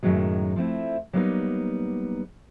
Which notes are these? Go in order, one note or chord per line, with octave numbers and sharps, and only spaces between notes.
F#2 A2 D#3 F#3 G#3
F3 A3 C4 E4
F#3 G3 A#3 B3 C#4 D#4